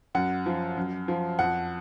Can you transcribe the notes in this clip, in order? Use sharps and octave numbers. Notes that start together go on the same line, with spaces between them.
F#2 F#5
F3
F#2
F3
F2 F#5